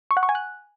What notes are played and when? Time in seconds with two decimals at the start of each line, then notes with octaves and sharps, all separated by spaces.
0.11 C#6
0.17 F#5
0.23 C#6
0.29 G#5
0.35 F#6